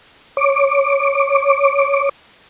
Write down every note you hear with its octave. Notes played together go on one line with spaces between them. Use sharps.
C#5 D6